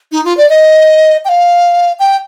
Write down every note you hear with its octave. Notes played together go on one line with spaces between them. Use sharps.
D#4
F4
D5
D#5
G5
F5
G5